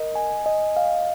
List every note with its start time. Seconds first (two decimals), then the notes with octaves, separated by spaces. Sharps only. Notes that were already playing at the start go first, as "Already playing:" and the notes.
Already playing: A#4 D#5
0.15 G#5
0.46 D#5
0.77 F5